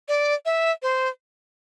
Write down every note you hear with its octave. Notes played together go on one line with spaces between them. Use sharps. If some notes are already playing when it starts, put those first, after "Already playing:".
D5
E5
C5